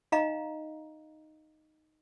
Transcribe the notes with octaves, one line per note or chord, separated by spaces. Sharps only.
D#4 D#5 F5 A#5